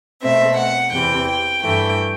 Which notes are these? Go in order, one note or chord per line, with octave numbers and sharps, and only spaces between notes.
B2 A3 C4 E5
F#5
E2 C3 E3 G5
G5
G2 E3 A3 G5